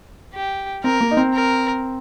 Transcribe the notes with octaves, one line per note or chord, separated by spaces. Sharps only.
G4
C4 A#4
A#3
D#4
C4
A#4